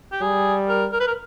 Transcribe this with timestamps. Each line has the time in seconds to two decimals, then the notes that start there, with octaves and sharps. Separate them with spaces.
0.12 G4
0.21 G3 G#4
0.68 A#4
0.92 A#4
1.00 B4
1.07 A#4